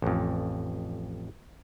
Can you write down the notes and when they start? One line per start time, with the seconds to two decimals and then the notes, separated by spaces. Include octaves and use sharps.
0.02 A1 F2